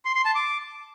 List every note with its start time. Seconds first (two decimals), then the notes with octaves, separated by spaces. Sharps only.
0.05 C6
0.15 C6
0.25 A5
0.35 D6